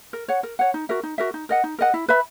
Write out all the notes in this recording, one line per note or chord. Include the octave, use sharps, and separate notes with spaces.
A#4
C#5 F#5
A#4
C#5 F#5
D#4
F#4 A#4 E5
D#4
F#4 A#4 E5
D#4
A#4 D#5 F#5
D#4
A#4 D#5 F#5
E4
B4 E5 B5